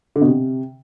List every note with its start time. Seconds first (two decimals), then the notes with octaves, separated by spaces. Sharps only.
0.16 D3
0.21 B2
0.27 C3